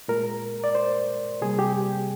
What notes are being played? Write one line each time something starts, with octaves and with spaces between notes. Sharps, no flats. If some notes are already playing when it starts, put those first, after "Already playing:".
A#2 G#3 A#4
D5
C5
C3 G3 A#3 G#4
G4